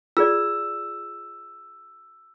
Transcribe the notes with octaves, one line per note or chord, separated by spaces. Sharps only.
F4 G#4 D5 E6